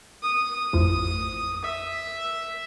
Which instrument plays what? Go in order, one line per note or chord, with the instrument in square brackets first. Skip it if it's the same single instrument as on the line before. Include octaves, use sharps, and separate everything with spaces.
[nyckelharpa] D#6
[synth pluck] A1 F2
[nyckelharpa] E5